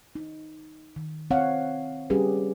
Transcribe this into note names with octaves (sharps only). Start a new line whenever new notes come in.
D#4
D#3
C4 C#5 F5 F#5
G3 C#4 G4 G#4 B4